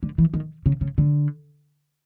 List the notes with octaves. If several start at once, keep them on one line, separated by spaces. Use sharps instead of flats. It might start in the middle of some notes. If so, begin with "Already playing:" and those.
D3
E3
D#3
C#3
C#3
D3